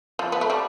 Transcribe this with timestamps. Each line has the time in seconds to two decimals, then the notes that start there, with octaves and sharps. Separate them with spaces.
0.19 F3
0.32 B3
0.41 A3
0.50 G3